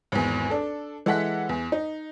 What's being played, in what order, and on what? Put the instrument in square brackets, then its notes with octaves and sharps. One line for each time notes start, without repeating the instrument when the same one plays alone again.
[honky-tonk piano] G#1 E2
D4 A4
E3 G#3 A4 F#5 F#6 B6
E2
D#4